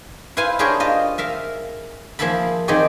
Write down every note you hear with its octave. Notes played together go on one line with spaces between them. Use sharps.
E4 B4 C5 F5 G#5
D4 G4 G#4 A#4 C5 C#5
F4 D#5
A#4 E5 F5
F3 A#3 G#4 E5 A5 B5
D#3 C4 G4 G#4 D5